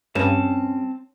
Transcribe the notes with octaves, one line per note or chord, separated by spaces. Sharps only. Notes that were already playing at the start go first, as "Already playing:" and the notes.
G2 C4 C#4 A5